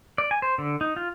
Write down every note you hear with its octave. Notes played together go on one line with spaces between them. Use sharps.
D5
G#5
C5
D3
D#4
F4